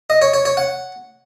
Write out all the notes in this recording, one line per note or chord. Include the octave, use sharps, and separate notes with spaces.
D#5
C#5
C#5
C#5
F#5